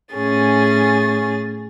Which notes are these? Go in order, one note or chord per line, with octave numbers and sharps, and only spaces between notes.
A2 C#4 G#4 A6